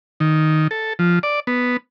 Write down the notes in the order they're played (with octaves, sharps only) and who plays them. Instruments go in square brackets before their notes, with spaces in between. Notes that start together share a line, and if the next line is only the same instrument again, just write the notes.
[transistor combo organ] D#3
A4
F3
D5
B3